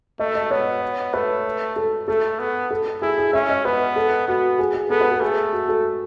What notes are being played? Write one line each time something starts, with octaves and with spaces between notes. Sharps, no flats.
A3 D#5
D#5
B3 C#5
A3 B4
A4
A3 A4
B3
A4
E4 G#4
G#4
C#4 E5
D#5
B3 B4
A4
B3 F#4
G#4
G#4
B3 A4
B4
A4
A3 G#4
F#4
A4